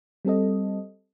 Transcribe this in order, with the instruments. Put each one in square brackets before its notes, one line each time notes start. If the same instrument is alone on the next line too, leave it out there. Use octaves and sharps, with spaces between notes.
[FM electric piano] G3 C4 A4 D#5